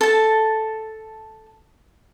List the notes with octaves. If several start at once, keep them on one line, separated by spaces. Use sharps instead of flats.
A4 A5